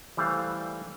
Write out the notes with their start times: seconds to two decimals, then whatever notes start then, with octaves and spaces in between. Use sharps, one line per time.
0.17 E3 G3 A3 C5 F5